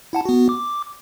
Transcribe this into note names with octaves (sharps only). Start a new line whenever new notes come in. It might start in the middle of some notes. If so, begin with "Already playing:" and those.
E4 F#5 A5
B3 F#4
D6